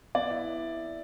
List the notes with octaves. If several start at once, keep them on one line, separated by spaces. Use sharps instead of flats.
B3 D5
E4